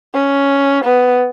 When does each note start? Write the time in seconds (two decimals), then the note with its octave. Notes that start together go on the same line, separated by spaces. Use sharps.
0.14 C#4
0.84 B3